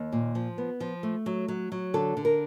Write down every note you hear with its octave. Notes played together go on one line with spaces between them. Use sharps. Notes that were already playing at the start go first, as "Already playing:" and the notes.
Already playing: D#2
A#2
F3
B3
F3
A3
F#3
F#3
F#3
D3 A4
D3
A#4